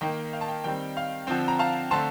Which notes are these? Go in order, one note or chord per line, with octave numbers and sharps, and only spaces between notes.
D#3 A#3 G5
F5
A5
G5
D#3 G3 C4 G5
F5
D3 F3 C4 G5
A#5
F5 A5
D3 A3 C4 A5 C6